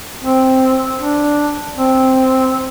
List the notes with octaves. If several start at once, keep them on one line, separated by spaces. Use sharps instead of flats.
C4
D4
C4